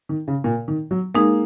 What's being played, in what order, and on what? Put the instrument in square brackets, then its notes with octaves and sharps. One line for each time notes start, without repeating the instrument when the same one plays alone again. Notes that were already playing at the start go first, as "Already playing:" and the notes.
[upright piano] D#3
C#3
A#2
D#3
F#3
[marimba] G#3 D#4 G#4 [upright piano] A#3